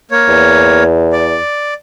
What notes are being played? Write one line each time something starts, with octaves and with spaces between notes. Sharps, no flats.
A#3 C#5
E2
D5